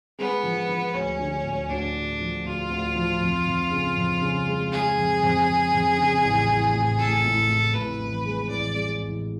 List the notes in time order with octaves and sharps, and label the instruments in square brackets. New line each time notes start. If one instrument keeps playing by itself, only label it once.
[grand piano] G#3 [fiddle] B3
[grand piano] F3
F3
[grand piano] D2 [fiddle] C#4
[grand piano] D3
D2
[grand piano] D2 [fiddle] D4
[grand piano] D3
F3
[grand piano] D2 [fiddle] F4
[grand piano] D2
F3
F2
F2
C#3
F2
C#3
G#3
[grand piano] G#3 [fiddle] G#4
[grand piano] F2
F2
F2
F2
C#3
A1
A1
A2
[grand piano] A2 [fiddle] A4
[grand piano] A2
A2
[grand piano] A2 [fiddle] B4
[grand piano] A1
G#3
[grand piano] A1 [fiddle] D5
[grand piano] G#3
A1